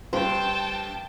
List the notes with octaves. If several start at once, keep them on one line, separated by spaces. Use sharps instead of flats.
G2 C5 G5 A5